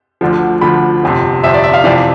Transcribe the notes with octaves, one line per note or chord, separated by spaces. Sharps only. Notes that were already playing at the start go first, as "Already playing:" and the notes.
D2 D3 F3
D2 D3 F3 B5
G1 F2 C3
G1 F2 C3 E5
D5
E5
F5
F1 F2 C3 E3 D5